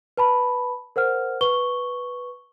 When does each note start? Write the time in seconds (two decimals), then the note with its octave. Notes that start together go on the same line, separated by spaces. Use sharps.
0.17 B4 A5 B5
0.96 A#4 C5 F#5 F6
1.41 B4 C#6 G7